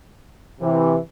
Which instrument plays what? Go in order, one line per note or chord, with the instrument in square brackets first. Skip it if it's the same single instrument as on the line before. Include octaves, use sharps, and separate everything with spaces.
[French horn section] C3 E3